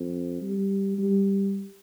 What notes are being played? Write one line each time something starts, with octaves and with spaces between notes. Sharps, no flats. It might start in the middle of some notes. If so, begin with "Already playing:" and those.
Already playing: F2
G3
G3